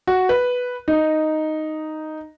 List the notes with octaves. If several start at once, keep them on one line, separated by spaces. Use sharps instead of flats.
F#4
B4
D#4